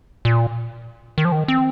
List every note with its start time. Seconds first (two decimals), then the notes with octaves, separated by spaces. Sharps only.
0.25 A#2
1.18 D#3
1.25 F3
1.32 D#3
1.48 C4